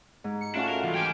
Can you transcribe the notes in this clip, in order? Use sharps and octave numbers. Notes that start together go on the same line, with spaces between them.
G#2
C#7
A3 C#4 D4 F4 F#4
A#4
C2 E3 F4
D#3 G4 G5 G#5 D6 F6